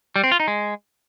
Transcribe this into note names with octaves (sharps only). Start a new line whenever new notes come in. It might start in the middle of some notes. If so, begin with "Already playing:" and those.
G3
C4
F4
D#4
G#3